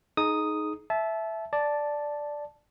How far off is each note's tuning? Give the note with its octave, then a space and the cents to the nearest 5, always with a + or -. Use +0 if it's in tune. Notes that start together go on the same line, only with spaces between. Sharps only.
D#4 +0 G#4 +30 D#6 +0
E5 +0 A5 -25
D5 +0 A5 -5